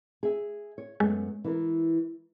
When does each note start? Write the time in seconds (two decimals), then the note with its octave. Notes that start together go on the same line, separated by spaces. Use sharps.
0.23 G#4 E5
0.78 C#5
1.00 F#2 G#3 A3 B3
1.44 E3 E4 A#4